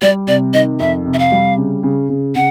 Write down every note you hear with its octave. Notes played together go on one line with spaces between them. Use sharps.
G3 D5
C3 D5
D#3 D#5
F2 E5
C3
E5
F5
G3
C#3
C#3
C#3
C#3 F#5